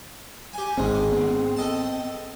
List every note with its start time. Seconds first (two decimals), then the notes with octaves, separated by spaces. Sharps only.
0.53 G4 G#5
0.77 G#1 G#2 G#3 C4
1.12 B3 C4
1.57 A4 D#5 A5